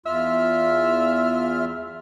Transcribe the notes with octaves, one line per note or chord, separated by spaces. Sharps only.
E2 F4 E5 F6